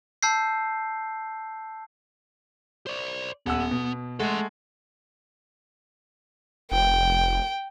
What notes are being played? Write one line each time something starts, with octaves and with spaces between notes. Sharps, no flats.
A5 E6 G6 C7
C5 D5
D#1 B3 F#5 E6
B2
G#3 A3 A4 F#5 C6
F1 G5